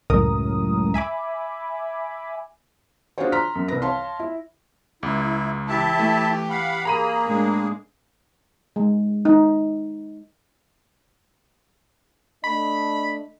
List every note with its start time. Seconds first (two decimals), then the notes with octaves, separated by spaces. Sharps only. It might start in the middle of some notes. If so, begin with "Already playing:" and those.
0.10 C#2 F#2 A2 A#4 D#6
0.94 E5 G#5 B5 D6
3.18 D4 F4 F#4 G#4 C5 C#5
3.32 A#5 C6 F6 B6
3.55 F#2
3.68 C2 B4 A#6
3.82 C#5 F5 A5 C6
4.19 E4
5.03 C#2 E4
5.68 E3 E4 G4 E5 A5
5.99 A3
6.50 F5 F#5 B5
6.85 A#3 G#4 A#5 B5 D#7
7.26 A2 G#3 D4
8.76 G#3
9.25 D#4
12.44 A3 D4 D#5 B5